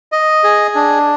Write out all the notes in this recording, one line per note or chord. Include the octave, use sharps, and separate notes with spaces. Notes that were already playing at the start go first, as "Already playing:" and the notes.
D#5
G#4
D4